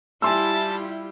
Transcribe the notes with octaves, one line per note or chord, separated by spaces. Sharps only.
G3 E4 F4 G4 G#5 A5 C6 E6